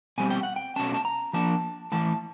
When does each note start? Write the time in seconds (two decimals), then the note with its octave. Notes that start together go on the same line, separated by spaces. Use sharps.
0.18 B2 G3 C4 G#5
0.30 G5
0.43 F#5
0.56 G5
0.76 B2 F#3 A3 C#4 A5
0.94 A5
1.05 A#5
1.33 F3 A#3 D4 A5
1.92 A2 E3 A3 A5